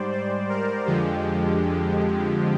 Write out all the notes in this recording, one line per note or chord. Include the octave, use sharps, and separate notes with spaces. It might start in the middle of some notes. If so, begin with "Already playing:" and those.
Already playing: G#2 G3 C5 D5
C5
A#4
F2 D3 F3 G#3 G4